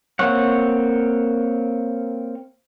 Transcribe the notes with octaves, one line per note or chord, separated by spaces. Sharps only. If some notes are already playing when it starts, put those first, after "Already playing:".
A#3 C4 C#5 F#5